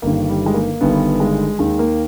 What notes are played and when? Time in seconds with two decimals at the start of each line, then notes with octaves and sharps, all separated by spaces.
0.02 G1 G2 D#3 A#3
0.29 G3
0.46 G#3
0.54 A#3
0.81 G1 G2 D#3 B3
1.20 G#3
1.59 D#2 D#3 G#3
1.79 A#3